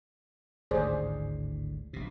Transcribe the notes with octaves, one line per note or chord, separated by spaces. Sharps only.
G#1 D2 A2 G#4 C5 D5
A#1 B2